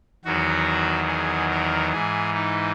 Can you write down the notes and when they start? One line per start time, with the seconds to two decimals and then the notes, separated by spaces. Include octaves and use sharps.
0.25 E2 D#3 F#3 F#4
1.08 G#4
1.51 A#4
1.92 G#2 E3 G#4
2.34 D#4